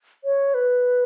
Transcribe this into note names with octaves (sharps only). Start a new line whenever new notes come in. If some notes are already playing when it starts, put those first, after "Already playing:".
C#5
B4